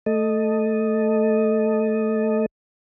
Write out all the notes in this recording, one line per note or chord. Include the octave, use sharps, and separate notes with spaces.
A3 A4 D#5